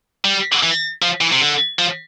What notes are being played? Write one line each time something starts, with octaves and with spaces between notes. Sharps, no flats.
G3
E3
F3
E3
C3
D3
F3